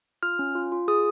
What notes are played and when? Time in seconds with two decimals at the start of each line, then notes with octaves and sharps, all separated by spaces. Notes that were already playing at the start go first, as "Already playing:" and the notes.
0.23 F4 F6
0.39 C#4
0.55 F4
0.72 F4
0.88 G#4 D#6